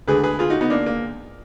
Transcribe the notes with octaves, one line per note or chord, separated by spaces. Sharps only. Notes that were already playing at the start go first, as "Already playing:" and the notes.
D2 D3 G#3 G#4 B4
G#4 B4
F4 G#4
D#4 F#4
B3 D#4
A#3 D4
A#3